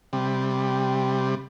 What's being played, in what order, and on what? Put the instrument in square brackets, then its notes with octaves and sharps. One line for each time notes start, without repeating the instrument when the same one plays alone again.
[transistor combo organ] C3 G3